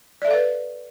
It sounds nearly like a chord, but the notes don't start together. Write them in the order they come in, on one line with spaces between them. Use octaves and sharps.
D5 E5 A4 F5 B4